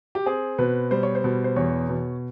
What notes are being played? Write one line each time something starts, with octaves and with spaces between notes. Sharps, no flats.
G4
C4 G#4
B2 B4
G3 C5
C#5
C5
B2
C5
E2 C#5
B2